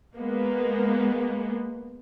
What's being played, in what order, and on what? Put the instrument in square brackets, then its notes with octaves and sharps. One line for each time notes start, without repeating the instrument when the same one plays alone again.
[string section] G#3 A#3 B3